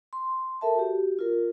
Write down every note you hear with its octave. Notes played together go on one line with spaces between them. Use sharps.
C6
A4 A#4 E5 A5
F#4 G4
F4 A#4